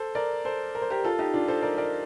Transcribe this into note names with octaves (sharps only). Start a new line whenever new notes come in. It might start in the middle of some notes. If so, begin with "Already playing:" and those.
Already playing: A4 C5
A#4 D5
A4 C5
A#4
C5
G4 A#4
F4 A4
D#4 G4
D4 F4
A4 C5
A#4 D5
A#4 D5